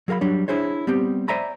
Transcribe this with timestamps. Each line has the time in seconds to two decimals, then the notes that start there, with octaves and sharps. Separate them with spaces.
0.08 F#3 G#4 A#4 F5 B5
0.21 F#3 G3 D4 C#5
0.48 D4 E4 G#4 C5 C#5
0.87 G3 B3 C4 G4
1.28 C5 D5 E5 G#5 A#5 B5